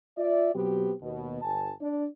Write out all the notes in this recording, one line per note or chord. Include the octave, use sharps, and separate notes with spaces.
F4 D5 E5
B2 F#3 B3 C4 G4
D#2 B2
G1 G#5 A5
D4 D5